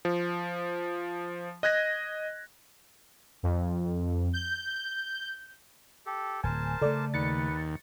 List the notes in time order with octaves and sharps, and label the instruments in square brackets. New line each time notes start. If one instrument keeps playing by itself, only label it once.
[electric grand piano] F3
D#5 F#6 G#6 A#6
[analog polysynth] F2
G6
[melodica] G4 A4
[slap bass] D1 [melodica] A#4 C5 A5 [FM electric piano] G#5
[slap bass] C#3 A3 [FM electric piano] A4 D5
[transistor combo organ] D#2 [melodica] B4 [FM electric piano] A6 C#7